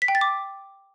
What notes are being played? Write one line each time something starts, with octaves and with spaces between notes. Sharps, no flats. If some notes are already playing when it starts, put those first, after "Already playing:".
B6
G5
A6
D6